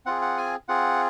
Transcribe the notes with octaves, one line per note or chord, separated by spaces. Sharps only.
C4 F4 G#4 F#5
F#5
G#5
C4 F4 G#4 F#5